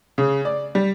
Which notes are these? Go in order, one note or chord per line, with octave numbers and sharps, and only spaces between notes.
C#3
D5
G3